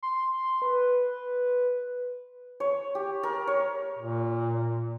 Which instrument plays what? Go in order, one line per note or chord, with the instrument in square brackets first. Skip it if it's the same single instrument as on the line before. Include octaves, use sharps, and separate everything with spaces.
[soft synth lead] C6
B4
[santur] C#5
G4
A#4
C#5
[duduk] A#2